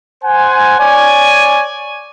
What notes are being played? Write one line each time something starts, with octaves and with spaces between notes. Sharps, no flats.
C5 F#5 G#5
C#5 D5 G#5